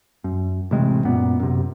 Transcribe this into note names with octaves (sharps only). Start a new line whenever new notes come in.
F#2
A1 C3 G#3 C4
F#2 A#2 B3
F#2 C3